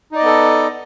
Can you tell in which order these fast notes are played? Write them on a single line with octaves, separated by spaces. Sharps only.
D#4 D5 D#5 B3 A4